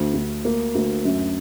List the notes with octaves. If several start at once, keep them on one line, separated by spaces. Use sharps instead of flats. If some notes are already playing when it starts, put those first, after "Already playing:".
Already playing: D2
D2
A#3
D2
F#2